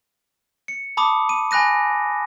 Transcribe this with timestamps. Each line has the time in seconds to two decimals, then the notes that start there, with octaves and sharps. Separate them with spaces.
0.68 C#7
0.97 A5 B5 D6 D#6
1.29 D#7
1.51 G#5 B5 F#6 A#6 D#7